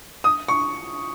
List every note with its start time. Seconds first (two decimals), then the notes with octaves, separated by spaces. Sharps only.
0.24 D#6
0.48 C#6